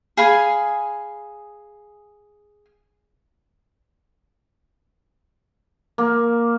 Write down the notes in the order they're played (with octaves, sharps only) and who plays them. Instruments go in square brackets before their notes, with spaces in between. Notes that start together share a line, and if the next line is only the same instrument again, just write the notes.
[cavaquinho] G#4 F5 G#5 B5
[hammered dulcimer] A#3